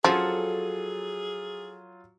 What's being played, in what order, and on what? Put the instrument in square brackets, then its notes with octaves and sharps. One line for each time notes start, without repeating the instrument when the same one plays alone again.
[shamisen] F3 [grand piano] F#3 F4 [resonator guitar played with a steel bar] C#4 A4 F#5 [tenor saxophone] G#4